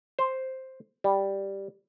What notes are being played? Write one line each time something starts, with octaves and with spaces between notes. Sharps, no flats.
C5
G3